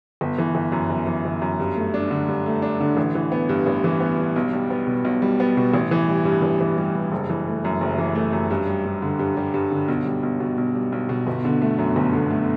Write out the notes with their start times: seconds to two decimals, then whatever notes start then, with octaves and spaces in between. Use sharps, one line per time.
0.21 G1
0.38 E3
0.55 G1
0.72 F#2
0.90 G1
1.07 E3
1.25 G1
1.42 F#2
1.60 G2
1.76 A3
1.94 D4
2.11 D3
2.28 G2
2.46 A3
2.62 D4
2.80 D3
2.97 A1
3.15 E3
3.32 B3
3.49 G2
3.66 A1
3.84 E3
4.00 B3
4.18 G2
4.36 B1
4.53 G3
4.70 B3
4.87 B2
5.05 B1
5.22 G3
5.40 B3
5.57 B2
5.74 A1
5.91 E3
6.08 G3
6.25 G2
6.42 A1
6.61 E3
6.78 G3
6.95 G2
7.11 F#1
7.30 E3
7.47 A3
7.65 F#2
7.81 F#1
7.98 E3
8.15 A3
8.33 F#2
8.51 G2
8.67 G3
8.85 G2
9.02 D3
9.19 G2
9.37 G3
9.54 G2
9.72 D3
9.88 B1
10.05 G3
10.23 B1
10.40 B2
10.58 B1
10.75 G3
10.92 B1
11.09 B2
11.27 G1
11.45 D3
11.62 A3
11.78 F#2
11.96 G1
12.13 D3
12.31 A3